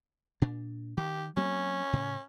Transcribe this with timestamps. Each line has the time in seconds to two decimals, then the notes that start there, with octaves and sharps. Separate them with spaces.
0.42 A#2 D4
0.97 D#3 G4
1.37 F#3 A#3 C4 C#4
1.93 A2 C#3